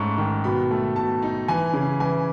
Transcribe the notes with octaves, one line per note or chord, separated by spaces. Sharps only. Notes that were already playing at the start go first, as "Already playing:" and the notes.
Already playing: G#2 A3 C#4 B5 C#6
D#3
B2 B5
A3
B2 A5
D#4
E3 G#5
C#3
E3 G#5